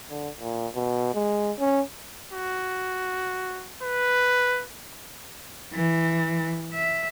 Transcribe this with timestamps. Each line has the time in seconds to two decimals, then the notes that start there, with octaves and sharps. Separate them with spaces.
0.11 D3
0.40 A#2
0.75 B2
1.14 G#3
1.59 C#4
2.33 F#4
3.83 B4
5.73 E3
6.74 E5